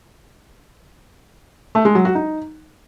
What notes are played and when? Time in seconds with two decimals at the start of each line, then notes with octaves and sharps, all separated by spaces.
1.75 A3
1.85 G#3
1.95 F#3
2.05 F#4
2.15 D#4